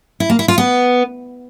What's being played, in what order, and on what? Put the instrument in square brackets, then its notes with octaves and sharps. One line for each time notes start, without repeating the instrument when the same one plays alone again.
[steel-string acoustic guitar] E4
A#3
E4
F4
B3